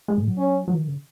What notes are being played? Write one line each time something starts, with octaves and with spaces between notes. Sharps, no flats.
G#3
A2
F#3
C#4
F#3
E3
D#3
C#3